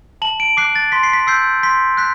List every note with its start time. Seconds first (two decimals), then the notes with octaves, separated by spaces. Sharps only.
0.22 A5 F#7
0.40 D7
0.57 D6 F#6 C7
0.76 A6
0.92 C6 B6
1.03 C7
1.13 B6
1.27 E6 G6 C7
1.63 C6 B6
1.97 F#6 B6